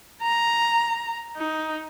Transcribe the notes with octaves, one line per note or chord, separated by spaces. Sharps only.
A#5
D#4